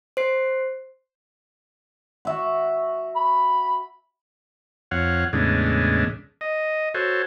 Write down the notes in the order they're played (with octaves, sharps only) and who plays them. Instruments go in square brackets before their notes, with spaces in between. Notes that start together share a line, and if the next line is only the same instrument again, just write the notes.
[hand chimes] C5 C7
[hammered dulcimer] F#4 E5 F#5
[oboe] B5
[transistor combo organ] F2 C#5 F5 F#5
E2 A2 C#3 G#3 D4
D#5
F#4 A4 C5 C#5